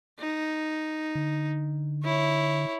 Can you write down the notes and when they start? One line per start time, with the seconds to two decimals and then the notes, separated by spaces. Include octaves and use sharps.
0.19 D#4
1.15 D3
2.04 E4 C#5